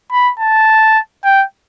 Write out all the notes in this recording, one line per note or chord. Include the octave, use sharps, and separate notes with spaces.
B5
A5
G5